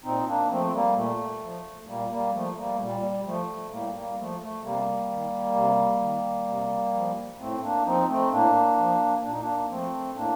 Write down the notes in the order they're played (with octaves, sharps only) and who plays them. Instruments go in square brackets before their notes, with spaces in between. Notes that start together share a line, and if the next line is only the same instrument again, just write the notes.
[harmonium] A#2 C4 D#4
A#3 D4
F3 A3 C4
C4
G3 A#3
A#2 A3
F3
A#2 G3 A#3
G3 A#3
F3 A3
G3 A#3
A3
A#2 G3
F3 A3
A2 G3 A#3
G3 A#3
F3 A3
A3
C3 G3 A#3
D#3
C3
D#3
C3
F3
A2 A3 C4
A#3 D4
F3 C4 D#4
A3 C4
A2 A#3 D4
F3
A#2 D4
D#4
A#3 D4
F3 A3 C4
A2 A#3 D4